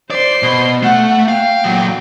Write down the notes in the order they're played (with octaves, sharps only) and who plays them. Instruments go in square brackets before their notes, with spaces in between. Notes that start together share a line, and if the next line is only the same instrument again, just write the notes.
[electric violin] C5 C6 [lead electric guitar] D5
[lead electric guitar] B2
[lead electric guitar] A3 [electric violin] F#5
[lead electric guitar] F5 [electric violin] G5
[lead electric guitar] A#2 F#3